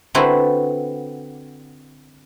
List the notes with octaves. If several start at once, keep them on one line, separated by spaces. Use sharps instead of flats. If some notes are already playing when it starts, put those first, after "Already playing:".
D3 C4 E4 F#4 B4 C5